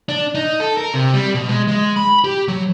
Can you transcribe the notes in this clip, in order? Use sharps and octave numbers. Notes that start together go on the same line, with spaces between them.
D4
D#4
A4
A#4
C3
G3
B2
G#3
G#3
B5
G4
F#3